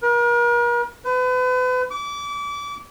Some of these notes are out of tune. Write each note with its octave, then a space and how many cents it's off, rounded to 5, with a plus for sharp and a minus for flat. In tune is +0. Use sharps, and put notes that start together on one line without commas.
A#4 +40
B4 +35
D6 -30